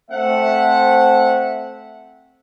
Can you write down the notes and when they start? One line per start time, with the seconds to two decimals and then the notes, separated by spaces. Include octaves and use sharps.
0.11 A3 C4 E5 F#5